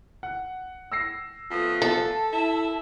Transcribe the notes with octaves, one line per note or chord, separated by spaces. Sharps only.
F#5
E6 A#6 C7
F3 A3 B3 D#6
A4 A5
E4 E5